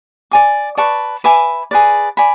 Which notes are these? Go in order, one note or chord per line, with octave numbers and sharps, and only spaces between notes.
D5 G#5 D6
B4 D5 A5 C#6
B4 E5 G#5 D6
G#4 B4 D5
D5 G#5 B5